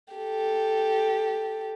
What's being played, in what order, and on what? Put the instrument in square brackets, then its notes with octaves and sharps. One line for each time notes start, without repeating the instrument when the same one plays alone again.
[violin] G4 A4